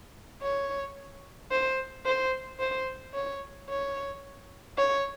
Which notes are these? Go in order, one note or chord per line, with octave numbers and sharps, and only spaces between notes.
C#5
C5
C5
C5
C#5
C#5
C#5